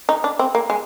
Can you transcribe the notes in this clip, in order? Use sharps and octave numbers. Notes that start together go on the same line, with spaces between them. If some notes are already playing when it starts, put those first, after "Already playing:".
D#4
D4
C4
A#3
G#3